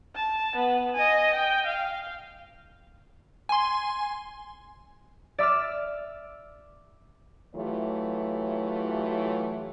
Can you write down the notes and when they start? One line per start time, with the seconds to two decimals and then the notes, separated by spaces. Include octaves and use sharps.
0.16 A5
0.55 B3
0.95 D#5 G#5
1.34 G5
1.67 F5
3.49 G#5 C6
5.38 D5 E5 D6 E6 F6
7.56 E3 F#3 A3 F4 G4 C#5